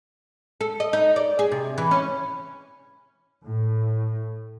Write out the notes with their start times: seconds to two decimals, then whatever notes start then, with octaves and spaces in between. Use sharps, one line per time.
0.61 A4
0.80 D#5
0.93 D#4
1.16 D5
1.39 G#4
1.52 C3
1.78 E3
1.91 C#4
3.47 A2